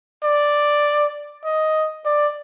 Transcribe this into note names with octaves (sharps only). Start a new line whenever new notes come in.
D5
D#5
D5